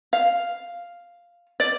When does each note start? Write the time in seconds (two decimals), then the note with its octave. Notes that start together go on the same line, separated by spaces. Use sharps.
0.13 F5
1.60 D5